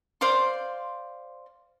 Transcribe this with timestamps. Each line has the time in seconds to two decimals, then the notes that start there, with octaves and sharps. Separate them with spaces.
0.21 C5 D5 F5 C6